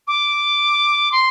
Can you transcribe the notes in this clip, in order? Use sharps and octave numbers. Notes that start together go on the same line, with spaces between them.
D6
C6